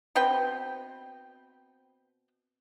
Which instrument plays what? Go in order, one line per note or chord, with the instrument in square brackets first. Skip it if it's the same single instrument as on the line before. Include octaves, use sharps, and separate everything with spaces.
[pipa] B2 C4 B4 G5